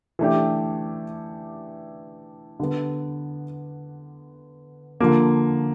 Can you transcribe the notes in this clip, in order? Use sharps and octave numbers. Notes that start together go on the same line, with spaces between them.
E3 A3 D4 G4
D3 G3 B3
D3 F3 A#3